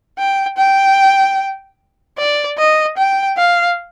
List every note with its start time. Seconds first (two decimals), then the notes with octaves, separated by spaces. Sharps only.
0.18 G5
0.57 G5
2.18 D5
2.58 D#5
2.97 G5
3.37 F5